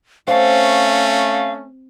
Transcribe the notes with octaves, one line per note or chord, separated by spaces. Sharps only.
A3 C4 C#4 F5